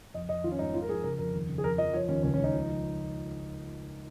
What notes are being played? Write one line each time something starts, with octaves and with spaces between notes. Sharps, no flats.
F2 D#5
F2 D#5
D#3 F4
C#4
G#2 D#4
F3 F4
A#4
F3 G#4
C#3 A#4
F2 A#4
D#2
C#3
G#4
F2 A#4
F3 D#5
F3 C#5
D#2 C#4
C#2 C#4
C#4
C#2
D#4
F3
F3